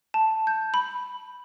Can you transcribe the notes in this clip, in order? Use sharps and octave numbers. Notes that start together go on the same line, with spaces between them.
A5
G6
B5